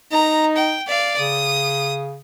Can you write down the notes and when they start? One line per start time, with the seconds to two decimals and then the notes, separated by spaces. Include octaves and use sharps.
0.12 D#4 A#5
0.56 G5
0.87 D5 F5
1.18 C#3 D#6